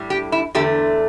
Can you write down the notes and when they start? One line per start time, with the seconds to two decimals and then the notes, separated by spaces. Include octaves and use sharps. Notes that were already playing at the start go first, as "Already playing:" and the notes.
Already playing: A2 G3
0.10 G4
0.32 E4
0.55 E2 D3 A3 G4